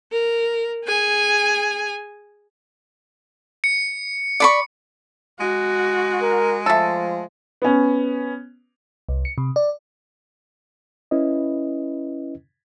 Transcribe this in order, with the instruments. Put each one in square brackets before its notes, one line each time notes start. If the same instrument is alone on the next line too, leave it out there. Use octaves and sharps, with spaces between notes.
[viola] A#4
G#4 G#5
[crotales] C#7
[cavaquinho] D5 B5 C#6
[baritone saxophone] G#3 [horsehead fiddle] F#4
[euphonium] A#4
[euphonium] F3 [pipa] A3 A4
[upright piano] B3 C#4
[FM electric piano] C2
C#7
C3
D5
[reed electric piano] C#4 E4 B4 D#5